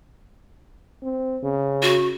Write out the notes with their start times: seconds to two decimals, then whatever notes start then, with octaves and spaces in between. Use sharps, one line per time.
1.02 C4
1.43 C#3
1.82 F#4